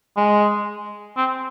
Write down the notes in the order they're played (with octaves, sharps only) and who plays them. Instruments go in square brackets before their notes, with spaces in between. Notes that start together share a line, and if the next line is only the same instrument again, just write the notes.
[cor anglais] G#3
C4